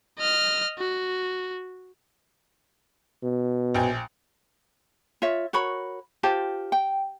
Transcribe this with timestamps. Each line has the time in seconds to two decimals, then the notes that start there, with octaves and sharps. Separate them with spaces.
0.19 D#5 F6
0.79 F#4
3.23 B2
3.74 A#1 G5 G#5
5.22 F4 C#5 E5
5.53 F#4 A#4 C#5 B5
6.23 F4 G4 C5 A5
6.72 G5